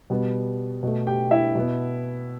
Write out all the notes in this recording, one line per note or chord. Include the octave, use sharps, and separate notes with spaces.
B2 G3 B3
B2 A3
G4 G5
E4 E5
B2 B3